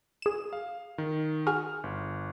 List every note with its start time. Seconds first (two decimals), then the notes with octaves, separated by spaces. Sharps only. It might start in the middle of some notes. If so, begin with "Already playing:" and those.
0.22 G#4 E7
0.53 F5
0.98 D#3
1.47 F#4 G#4 F6
1.83 G1